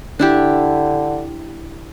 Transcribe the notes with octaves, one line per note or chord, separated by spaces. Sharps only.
D3 D4 E4 G4